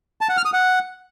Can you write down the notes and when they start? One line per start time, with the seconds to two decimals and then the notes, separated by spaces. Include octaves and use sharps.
0.21 A5
0.29 F#5
0.37 F6
0.45 D#6
0.53 F#5